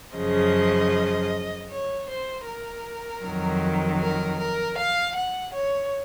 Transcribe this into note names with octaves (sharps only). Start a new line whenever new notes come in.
F#2 C#3 F3 D#5
C#5
C5
A#4
F2 D#3 F#3
A#4
A#4
F5
F#5
C#5